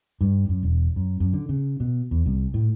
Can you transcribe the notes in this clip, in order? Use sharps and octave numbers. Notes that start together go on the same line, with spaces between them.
G2
F#2
E1
F#2
F#2
D3
C#3
B2
E2
C2
A2